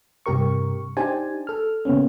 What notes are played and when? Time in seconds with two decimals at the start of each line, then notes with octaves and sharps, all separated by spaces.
0.26 G2 C3 G4 A#4 C#6
0.97 D4 D#4 G4 C5 G#5 A5
1.47 A4 F6
1.85 C#3 A#3 B3 C#4